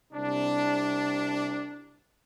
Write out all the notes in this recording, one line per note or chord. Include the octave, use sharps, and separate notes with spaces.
C2 C3 D4